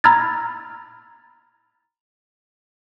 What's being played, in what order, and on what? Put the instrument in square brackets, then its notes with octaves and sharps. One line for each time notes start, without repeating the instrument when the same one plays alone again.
[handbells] A#5 B5 E6 F6 G#6 A6